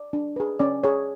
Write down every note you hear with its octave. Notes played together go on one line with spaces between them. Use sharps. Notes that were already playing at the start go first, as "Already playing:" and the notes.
Already playing: D5
D4
G#4 B4
C#4 D5
G#4 C#5